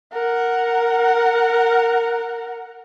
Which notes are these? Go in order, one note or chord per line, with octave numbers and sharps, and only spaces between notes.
A#4 F#5